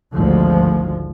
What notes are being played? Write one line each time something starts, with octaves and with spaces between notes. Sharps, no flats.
G#1 D2 G#2 F3 G#3